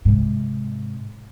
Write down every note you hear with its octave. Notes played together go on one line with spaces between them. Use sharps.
G#2 C3